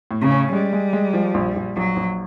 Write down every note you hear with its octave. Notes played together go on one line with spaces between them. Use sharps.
A2
C#3
C#4
G3 G#3
G#3
G#3
F3
A#1
A#1
A#1 F#3
A#1